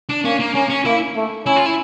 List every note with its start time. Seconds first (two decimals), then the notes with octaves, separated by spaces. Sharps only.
0.09 D4
0.24 A#3 C#4
0.40 A#3
0.55 A#3 C#4
0.70 C#4
0.85 A#3 E4
1.16 A3
1.46 C#4 E4
1.56 F4
1.66 E4